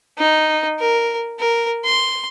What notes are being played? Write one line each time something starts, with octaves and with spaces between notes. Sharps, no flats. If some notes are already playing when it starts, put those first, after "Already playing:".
D#4
A#4
A#4
C6